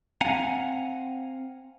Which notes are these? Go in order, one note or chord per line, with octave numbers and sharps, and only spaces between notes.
C4 F5 F#5 G#5 A#5